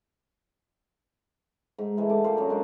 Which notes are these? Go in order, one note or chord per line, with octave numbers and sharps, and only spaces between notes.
G#2
E3 G#3 A3
D3 D6
A#2 C5
F#2 A#5
G#3 D4 C5 D6